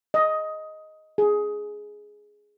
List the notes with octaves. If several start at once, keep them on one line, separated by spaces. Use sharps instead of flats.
D#5
G#4